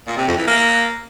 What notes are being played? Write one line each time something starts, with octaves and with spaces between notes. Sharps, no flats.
A#2
C3
F2
E3
A#3